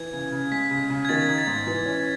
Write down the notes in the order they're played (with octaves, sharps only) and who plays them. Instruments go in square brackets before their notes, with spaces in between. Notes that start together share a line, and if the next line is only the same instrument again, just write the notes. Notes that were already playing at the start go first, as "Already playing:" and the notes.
Already playing: [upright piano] E3 [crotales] G#6
[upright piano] C#3
C#3
[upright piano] G#3 [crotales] B6
[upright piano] C#3
C#3
[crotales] G#6
[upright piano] D#3 [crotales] A6
[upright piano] D#4 [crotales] G#6
[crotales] A6
[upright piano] G#2
E3
C#4